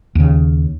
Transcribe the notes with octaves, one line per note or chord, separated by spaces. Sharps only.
D#2 C#3